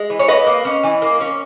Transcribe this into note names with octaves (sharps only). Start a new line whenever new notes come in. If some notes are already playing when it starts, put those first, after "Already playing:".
Already playing: G#3
E3
C#5
A#3 B4 D#5
A#3
C#4
E3
A#3
C#4